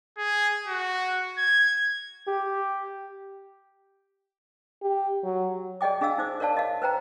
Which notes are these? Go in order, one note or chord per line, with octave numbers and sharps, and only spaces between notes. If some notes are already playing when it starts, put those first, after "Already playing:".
G#4
F#4
G#6
G4
G4
F#3
G#4 D5 D#5 G5 D6
D4 G#4 D#5 F5 E6
D#4 C5 D6
A#4 C#5 D5 F5 A5
D#5 F5
B4 C5 G5 A#5